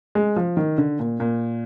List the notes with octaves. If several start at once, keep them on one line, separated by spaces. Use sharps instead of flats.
G#3
F3
D#3
D3
A#2
A#2